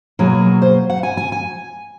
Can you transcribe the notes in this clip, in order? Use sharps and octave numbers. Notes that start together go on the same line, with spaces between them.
B2 F#3 A#3 G#4
C5
F#5
G#5
G#5
G#5